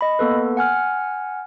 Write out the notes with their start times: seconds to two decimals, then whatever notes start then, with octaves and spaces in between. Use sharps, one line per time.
0.01 D#5 B5
0.19 A#3 B3 A4 B4
0.57 F#5 G#5 F6